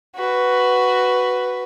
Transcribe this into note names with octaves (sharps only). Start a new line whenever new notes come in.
F#4 B4